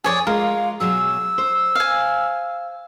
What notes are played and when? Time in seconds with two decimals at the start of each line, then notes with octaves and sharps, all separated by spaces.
0.04 F2 G#4 C#5 D5 G#5
0.27 G#3 F4 A#4 F5
0.80 B2 F#3 G#4 E6
1.38 C5
1.75 F5 G#5